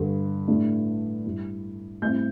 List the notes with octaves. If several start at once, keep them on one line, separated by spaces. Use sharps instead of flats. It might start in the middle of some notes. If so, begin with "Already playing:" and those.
Already playing: G2 D3 G3
A2 G3 D4
G2 G3 E4
A2 G3 C4 E4 G6